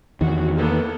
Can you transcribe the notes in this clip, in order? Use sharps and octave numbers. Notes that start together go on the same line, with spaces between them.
E2 D#3 F#4
A#3 B3 A4